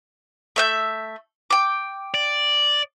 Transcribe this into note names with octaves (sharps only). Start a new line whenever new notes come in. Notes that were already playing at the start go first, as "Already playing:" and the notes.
A3 E5 G6
G5 D6
D5